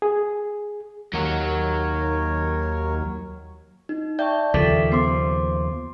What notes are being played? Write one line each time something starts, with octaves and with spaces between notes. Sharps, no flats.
G#4
D#2 F#3 A#4 C#5 F#5
D#4
D5 E5 G5 A5 C#6 G6
D#2 C#3 F3 A4 E5 D6 B6
B3 C5 C6 D6